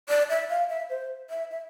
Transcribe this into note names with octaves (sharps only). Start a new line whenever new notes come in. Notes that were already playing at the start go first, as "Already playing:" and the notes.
D5
E5
F5
E5
C5
E5
E5